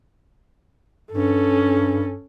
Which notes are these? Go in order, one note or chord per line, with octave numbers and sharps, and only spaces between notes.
G2 C#4 A4